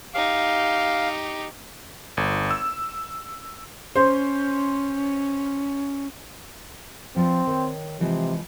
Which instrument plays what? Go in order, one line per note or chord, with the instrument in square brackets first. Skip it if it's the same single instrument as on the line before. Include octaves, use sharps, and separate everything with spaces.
[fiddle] D#4 G4 [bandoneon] F5
[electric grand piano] G1
E6
[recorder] C#4 [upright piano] C5
[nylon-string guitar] F3 B4 D5 [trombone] C4
[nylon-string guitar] D#3 C#5
[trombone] C3 [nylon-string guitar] E3 F3 G#3